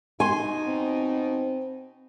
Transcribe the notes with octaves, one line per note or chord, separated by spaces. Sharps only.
B2 D#4 G#5 C6
C4